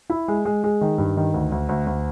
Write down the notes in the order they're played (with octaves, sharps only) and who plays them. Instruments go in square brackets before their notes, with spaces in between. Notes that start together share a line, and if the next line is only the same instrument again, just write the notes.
[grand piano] E4
G#3
G#3
G#3
D#3
G2
D#3
D2
D2
D2
D2